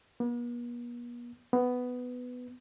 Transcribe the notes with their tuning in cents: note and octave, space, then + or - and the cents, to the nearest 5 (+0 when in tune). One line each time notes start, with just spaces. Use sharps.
B3 -45
B3 +10